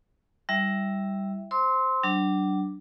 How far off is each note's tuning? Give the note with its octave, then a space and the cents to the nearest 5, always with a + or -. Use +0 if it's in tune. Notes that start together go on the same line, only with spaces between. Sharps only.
G3 +0 E4 +0 E5 +0
C5 +0 C6 +0 E6 -35
F#3 +40 D4 +0